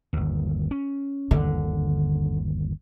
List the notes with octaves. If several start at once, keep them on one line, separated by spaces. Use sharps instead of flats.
G1 D#2
C#4
G1 D#2 D3